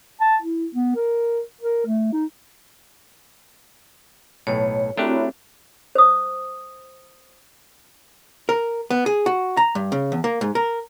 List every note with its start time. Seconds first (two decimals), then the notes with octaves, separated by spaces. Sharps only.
0.21 A5
0.42 E4
0.75 B3
0.96 A#4
1.61 A#4
1.87 A3
2.13 D#4
4.47 B1 A2 C#5
4.98 A3 C4 D4 E4 F#4 G4 A#4 C#5
5.95 C5 D#6
8.49 A#4
8.90 B3
9.06 G#4
9.26 F#4
9.57 A#5
9.75 G2
9.92 C#3
10.12 E2
10.24 A#3
10.41 G#2
10.55 A#4